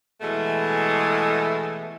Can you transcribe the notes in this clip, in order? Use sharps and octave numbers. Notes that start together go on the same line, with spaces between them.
B2 E3 G#3 A3